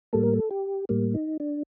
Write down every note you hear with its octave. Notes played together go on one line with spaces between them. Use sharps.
A2 G3 A#3 A4
A#4
A4
G4
A2 G3 A#3
D#4
D4